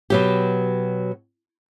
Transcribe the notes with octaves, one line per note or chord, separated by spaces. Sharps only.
B2 F#3 G4